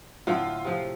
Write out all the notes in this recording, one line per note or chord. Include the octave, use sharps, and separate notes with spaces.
A2 D3 A3 F4
C3 F3